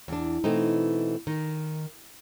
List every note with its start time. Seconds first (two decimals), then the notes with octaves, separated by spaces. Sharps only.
0.08 E2 D4
0.44 B2 E3 A3 C4 D#4
1.27 D#3